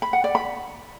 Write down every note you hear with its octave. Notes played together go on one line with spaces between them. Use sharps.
B5
F#5
D5
B5